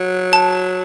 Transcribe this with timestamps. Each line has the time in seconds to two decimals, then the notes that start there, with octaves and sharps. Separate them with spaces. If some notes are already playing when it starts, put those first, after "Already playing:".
Already playing: F#3
0.33 A5